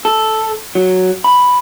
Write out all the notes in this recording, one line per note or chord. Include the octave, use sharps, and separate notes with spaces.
A4
F#3
B5